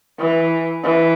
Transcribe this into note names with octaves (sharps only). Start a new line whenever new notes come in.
E3
E3